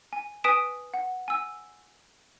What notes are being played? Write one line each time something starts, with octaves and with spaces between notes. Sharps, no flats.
G#5
B4 G#5 D#6 B6 D7 E7
F#5
G#5 E6